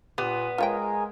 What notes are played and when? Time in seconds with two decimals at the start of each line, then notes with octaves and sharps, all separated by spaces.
0.18 A#2 B3 G4
0.58 G#3 F4 G#4 A#4 C#5 G5 G#5